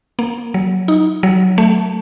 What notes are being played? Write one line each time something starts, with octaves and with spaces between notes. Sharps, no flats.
A#3
F#3
D#4
F#3
A3